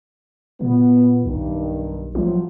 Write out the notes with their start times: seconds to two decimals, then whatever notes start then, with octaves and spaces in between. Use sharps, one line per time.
0.61 A#2 B3
1.25 B1 G2 D#3
2.15 A2 F3 F#3